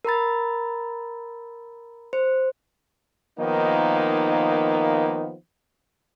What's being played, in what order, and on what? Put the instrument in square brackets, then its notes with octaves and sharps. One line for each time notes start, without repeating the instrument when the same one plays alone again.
[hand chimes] A#4 A#5 B5 A6
C5
[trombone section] D#3 F3 A#3 B3 D#4